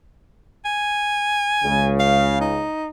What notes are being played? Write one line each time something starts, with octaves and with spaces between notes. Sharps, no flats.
G#5
C#2 C#3
F5
D#4